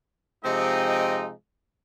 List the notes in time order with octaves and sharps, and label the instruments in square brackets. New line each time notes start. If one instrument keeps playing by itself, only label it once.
[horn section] C3 F3 G#3 C4 D#4 D#5